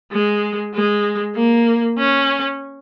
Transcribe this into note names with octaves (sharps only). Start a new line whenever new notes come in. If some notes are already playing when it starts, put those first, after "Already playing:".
G#3
G#3
A#3
C#4